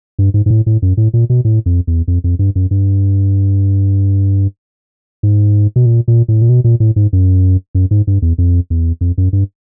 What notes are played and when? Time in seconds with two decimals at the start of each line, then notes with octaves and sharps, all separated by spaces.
0.19 G2
0.34 G#2
0.46 G#2
0.50 A2
0.66 A2
0.82 F#2
0.97 A2
1.14 A#2
1.30 B2
1.45 A2
1.66 F2
1.87 E2
2.08 F2
2.24 F2
2.39 G2
2.55 F#2
2.71 G2
5.23 G#2
5.76 B2
5.86 A#2
6.08 A#2
6.28 A2
6.42 A#2
6.49 B2
6.64 A#2
6.80 A2
6.96 G#2
7.13 F#2
7.75 F#2
7.91 G#2
8.07 G2
8.22 E2
8.38 F2
8.70 E2
9.01 F2
9.18 F#2
9.33 G2